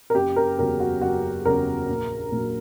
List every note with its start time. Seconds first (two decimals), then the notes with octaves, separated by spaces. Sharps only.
0.10 A#4
0.14 F#1 G4
0.36 A#4
0.59 E2 C#3 F#3 A#4
0.80 F#4
1.01 F#1 F#4
1.45 E2 C#3 F#3 A#4
1.88 A#1
2.32 A#2 F#3